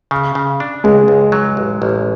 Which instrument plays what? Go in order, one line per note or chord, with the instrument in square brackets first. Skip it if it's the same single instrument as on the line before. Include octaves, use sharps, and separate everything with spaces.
[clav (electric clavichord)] C#3
C#3
D4
[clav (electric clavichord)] C#2 [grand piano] G#3
[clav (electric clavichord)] C#2
F#3
A1
A1